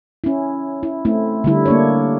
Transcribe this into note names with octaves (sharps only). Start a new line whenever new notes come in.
C#4 E4
E4
A3 C4 E4
D3 G3 E4
A#3 D4 C#5